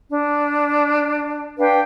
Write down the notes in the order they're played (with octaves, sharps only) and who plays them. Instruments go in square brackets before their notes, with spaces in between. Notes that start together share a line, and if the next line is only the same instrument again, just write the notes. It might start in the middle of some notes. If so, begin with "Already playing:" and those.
[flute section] D4
D4 B4 F5 G5